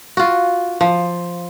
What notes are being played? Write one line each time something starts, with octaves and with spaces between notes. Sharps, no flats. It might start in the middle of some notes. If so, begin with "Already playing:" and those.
F4 F#4
F3